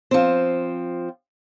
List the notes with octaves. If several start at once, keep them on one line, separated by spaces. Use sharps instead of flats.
F3 C4